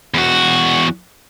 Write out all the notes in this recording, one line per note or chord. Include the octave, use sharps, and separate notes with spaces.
E2 F#4